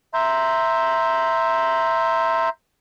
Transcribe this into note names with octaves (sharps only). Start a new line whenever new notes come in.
E5 A#5 C6 G6